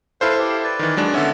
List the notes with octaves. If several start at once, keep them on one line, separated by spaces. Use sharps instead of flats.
E4 A4 B4 C5 F5
G4
B4 D5
D#3 E3
F#3 G#3 D4
D3 B3 C#4 E5